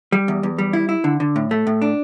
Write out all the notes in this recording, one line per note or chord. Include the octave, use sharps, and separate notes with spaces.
G3
E2
E2
G3
E4
E4
D3
D3
A2
A3
A2
D4